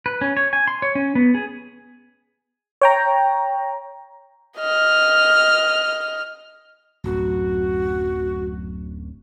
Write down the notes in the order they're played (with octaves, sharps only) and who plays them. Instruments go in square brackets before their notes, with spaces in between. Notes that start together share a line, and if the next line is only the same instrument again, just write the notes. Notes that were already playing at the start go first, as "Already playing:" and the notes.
[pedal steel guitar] B4
C#4
C#5
G#5
C6
C#5
C#4
B3
G#4
[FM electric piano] C#5 G5 A#5
[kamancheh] D#5 F6
[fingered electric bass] D1 F#2 [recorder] F#4